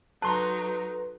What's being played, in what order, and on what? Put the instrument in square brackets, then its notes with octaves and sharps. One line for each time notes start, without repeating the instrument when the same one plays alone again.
[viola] F#3 D#4 [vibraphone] A4 B4 [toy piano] A5 [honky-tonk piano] A#5 C6 F#6